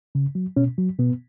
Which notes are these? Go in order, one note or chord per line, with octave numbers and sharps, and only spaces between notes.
C#3
F#3
B2 C#4
F#3
B2 B3